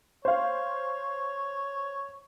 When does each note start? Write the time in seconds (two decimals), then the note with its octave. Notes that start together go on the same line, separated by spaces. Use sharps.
0.25 C5 C#5 F5